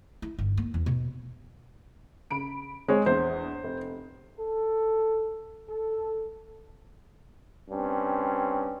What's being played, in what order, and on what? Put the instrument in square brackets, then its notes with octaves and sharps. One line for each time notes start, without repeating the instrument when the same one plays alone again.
[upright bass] E4
G1
A#3
E2
B2
[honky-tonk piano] C#3 B5 D7
[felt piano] G#3 C#5 [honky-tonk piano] C4
[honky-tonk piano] A#1 E2 [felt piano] C5
[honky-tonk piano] F1
[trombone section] A4
A4
G2 C4 C#4